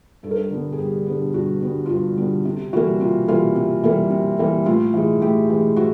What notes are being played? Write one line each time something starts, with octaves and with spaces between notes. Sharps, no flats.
G2 A4
A#4
A4
D3 G3 B3
G#4
G2 G4
D3 G3 B3
G2 F#4
D3 G3 B3
F4
G2 F#4
D3 G3 B3
C3
E3 G3 A#3 F#4
C3 F4
E3 G3 A#3 F4
C3
E3 G3 A#3
C3
E3 G3 A#3
A2 F4
E3 G#3
A2 G4
E3 G#3
A2 F#4